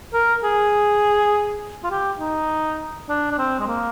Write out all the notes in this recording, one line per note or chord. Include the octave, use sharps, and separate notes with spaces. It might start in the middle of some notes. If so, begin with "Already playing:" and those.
A#4
G#4
F4
G4
D#4
D4
D4
C4
G#3
A#3